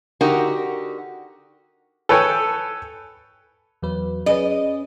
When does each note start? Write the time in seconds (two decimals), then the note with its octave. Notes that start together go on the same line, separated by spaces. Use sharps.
0.21 D3 D#4 F#4 G4 A#4
2.09 A4 B4 C#5 G5 G#5
3.82 E2 F#3 B4
4.26 C#4 G#4 B4 D#5